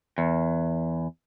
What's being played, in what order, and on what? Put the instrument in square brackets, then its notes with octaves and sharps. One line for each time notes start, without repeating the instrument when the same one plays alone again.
[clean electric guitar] E2